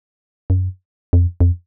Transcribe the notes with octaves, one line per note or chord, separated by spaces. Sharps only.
F#2
F2
F2